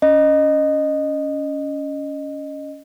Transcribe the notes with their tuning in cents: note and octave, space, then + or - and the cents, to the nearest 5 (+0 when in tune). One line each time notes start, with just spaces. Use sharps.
C#4 +20 D#5 -15